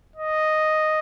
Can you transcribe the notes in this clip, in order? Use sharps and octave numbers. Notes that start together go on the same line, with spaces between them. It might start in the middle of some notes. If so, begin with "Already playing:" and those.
D#5